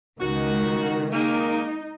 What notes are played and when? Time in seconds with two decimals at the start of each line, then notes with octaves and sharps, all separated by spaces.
0.20 C#2 D#3 F#4
1.12 D#3 G#3 A#3 D#4